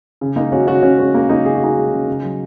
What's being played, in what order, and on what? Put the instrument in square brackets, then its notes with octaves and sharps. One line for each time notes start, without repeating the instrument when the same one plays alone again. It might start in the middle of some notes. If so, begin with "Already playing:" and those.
[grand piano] C#3
G#3 A#3 D#4
G#3 C#4 F#4
C#3 C#4 F#4
C#3 C#4
G#3 C#4
G#3 A#3
C#3 A#3 D#4
C#3 G#4
F#4
G#3 D#4 G#4
G#3
C#3
C#3
F#3